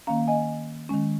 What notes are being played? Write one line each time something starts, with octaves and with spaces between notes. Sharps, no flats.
D#3 A#3 C#4 F5 A#5
D#5 G#5
D#3 G#3 C#4